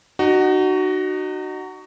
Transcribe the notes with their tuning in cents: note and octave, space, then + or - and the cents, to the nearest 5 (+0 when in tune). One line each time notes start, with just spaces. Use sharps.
D#4 -30 F#4 +15